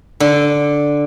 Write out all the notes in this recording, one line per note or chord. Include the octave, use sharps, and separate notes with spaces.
D3